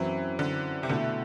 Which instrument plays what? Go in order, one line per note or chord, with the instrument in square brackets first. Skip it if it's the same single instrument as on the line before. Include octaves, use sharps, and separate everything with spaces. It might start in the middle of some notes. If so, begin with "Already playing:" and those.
Already playing: [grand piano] F#2 F#3 C4 E4 [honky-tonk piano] E3
[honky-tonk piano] D3
C3
[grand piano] B2 A3 E4 [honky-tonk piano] D3